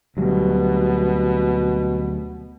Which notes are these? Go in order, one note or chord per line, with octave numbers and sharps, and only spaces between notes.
D2 B2 F#3 G3